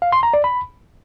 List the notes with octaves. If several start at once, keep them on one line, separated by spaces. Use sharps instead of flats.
F5
C6
A#5
D5
B5